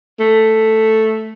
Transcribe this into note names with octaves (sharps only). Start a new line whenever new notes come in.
A3